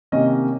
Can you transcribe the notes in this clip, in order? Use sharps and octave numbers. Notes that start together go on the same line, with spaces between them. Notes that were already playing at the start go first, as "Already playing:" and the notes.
C3 D#3 A#3 C#4 D#5